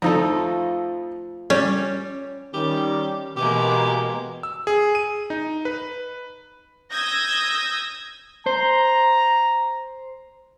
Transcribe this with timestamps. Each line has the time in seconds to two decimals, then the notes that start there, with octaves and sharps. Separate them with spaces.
0.02 F2 F3 A3 D#4 A4
1.50 G3 C#4
2.54 D#3 G3 C#4 G4
3.37 B2 E3 G#3 A#3 G4
4.43 E6
4.67 G#4
4.95 D#7
5.30 D#4
5.65 B4
6.92 D#6 E6 G6 G#6 A#6
8.46 C5 A#5